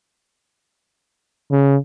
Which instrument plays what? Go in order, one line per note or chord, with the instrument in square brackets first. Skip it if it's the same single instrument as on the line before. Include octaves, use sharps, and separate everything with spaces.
[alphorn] C#3